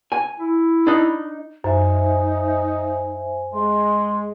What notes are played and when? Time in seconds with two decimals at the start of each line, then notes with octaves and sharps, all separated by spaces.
0.12 G#5
0.40 E4
0.87 D4 D#4
1.64 F#2 D#4 C5 E5 G#5
3.54 G#3 C6